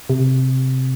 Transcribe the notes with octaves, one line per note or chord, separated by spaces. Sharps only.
C3